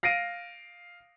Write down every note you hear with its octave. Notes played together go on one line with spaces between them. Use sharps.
F5 A#6 C7 D7 D#7